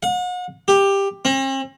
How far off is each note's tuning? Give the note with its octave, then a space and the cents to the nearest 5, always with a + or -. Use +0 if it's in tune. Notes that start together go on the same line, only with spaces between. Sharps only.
F#5 -40
G4 +10
C4 +45